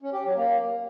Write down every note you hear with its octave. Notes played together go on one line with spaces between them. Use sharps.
C#4
G4
F#3
A#3